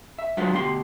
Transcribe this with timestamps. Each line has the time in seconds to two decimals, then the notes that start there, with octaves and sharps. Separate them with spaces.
0.19 E5
0.37 F#3 G#3 D4 F4 B4 C5
0.52 D2 B2 G4 A#4 C6